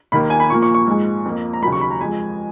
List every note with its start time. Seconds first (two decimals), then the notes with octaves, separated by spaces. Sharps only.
0.12 D#2 D#3 A#3 B5
0.30 G#5
0.40 B5
0.50 A#2 F3 A#3 C#6
0.62 C#6
0.74 C#6
0.87 G#2 F3 G#3
1.25 F2 F3 A#3
1.53 A#5
1.62 D#2 C#3 F#3 A#3 B5
1.72 C#6
1.81 B5
1.91 A#5
2.01 F2 F3 G#3 G#5